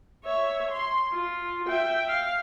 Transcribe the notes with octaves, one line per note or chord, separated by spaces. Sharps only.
C#5 E5
C6
F4
E5 G5
F5